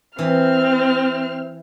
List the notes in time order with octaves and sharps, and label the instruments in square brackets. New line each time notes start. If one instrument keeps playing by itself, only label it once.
[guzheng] E3 [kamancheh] C4 F6